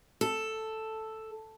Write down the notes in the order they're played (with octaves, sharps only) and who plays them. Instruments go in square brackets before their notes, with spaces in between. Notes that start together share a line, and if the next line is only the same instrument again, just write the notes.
[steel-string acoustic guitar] A4